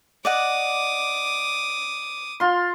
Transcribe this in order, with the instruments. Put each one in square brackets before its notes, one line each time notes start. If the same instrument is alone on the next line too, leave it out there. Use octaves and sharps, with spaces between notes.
[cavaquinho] D5 D#5 F#5 [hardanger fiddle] D6 D#6
[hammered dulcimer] F4 C6